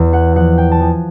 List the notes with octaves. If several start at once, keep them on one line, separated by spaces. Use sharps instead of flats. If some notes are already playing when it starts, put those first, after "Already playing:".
Already playing: E2
F#5
F3 F#5
G5
A5
F3 G#5